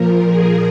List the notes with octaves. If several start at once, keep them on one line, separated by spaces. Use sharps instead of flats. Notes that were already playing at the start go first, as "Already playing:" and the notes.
Already playing: A#2 F3 A#4
G#4